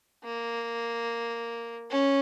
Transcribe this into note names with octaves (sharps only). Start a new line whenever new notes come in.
A#3
C#4